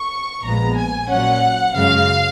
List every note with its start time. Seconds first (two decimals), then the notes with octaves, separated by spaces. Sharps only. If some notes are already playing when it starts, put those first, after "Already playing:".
Already playing: C#6
0.44 A#1 A#2 F3 G#3 B3 A#5
0.77 G#5
1.09 A#2 F#3 C#4 F#5
1.75 F#2 C#3 G#3 F5